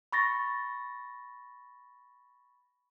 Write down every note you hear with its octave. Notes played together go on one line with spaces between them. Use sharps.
B5 C#6 A6 A#6